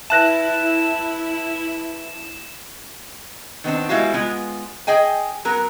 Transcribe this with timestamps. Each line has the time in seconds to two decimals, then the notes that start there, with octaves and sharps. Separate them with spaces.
0.10 E4 B4 E5 A5 F#6 A#6 E7
3.64 D#3 B3 C4 D4
3.89 G3 G#3 B3 E4 F#4 F5
4.14 G#3 B3 F4
4.87 G#4 D#5 G5 G#5
5.45 F#3 B3 A#4